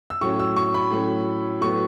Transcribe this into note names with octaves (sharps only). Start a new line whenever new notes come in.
E6
A2 F#3 C#4 C#6
E6
C#6
B5
A2 F#3 C#4
A2 F#3 B3 C#6